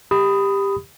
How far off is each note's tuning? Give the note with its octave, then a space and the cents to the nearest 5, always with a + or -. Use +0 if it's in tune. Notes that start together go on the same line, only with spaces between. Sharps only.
G4 +15 B5 +15 D#6 +0